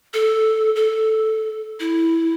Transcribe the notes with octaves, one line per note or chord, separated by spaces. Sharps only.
A4
A4
E4